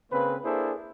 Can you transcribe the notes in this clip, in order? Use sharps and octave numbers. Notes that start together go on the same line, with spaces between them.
C#3 A#3 C4 B4
A#3 D4 E4 G#4 A4 C5